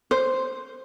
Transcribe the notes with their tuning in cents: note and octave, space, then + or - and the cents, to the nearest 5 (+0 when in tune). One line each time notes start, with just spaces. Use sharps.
C5 +0